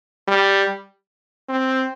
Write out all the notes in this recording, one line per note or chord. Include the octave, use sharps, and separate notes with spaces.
G3
C4